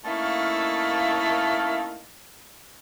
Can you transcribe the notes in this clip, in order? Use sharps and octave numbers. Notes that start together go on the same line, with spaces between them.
A3 A#3 C#4 D#4 E4 F5